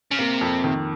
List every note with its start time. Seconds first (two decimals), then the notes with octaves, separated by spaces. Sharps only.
0.11 C#3
0.19 C3 A#3
0.41 F2
0.64 D#3